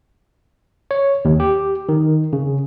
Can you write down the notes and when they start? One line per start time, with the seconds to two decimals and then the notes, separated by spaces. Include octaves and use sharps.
0.91 C#5
1.25 D#2
1.40 G4
1.89 D#3
2.33 C#3